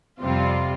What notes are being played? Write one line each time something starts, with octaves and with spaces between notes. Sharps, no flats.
F2 C3 G3 C4 F4